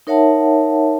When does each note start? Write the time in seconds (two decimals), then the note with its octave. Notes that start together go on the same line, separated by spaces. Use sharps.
0.07 D#4 A#4 C#5 E5 F#5 A5